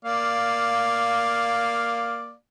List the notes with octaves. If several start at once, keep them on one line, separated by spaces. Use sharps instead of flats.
A#3 D5 F5